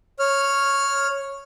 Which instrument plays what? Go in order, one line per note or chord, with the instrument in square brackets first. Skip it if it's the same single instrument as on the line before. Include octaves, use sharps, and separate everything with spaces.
[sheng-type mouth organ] C#5 F6